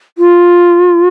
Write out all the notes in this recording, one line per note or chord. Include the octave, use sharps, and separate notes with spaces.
F4